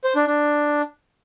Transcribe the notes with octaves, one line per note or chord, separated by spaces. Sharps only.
C5
D4
D4